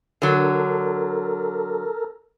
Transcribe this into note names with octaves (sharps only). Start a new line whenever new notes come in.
D3 F#3 A4 A#4